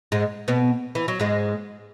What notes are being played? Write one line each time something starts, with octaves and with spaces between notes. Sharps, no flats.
G#2 G#3
B2 B3
E3
F#3
G#2 G#3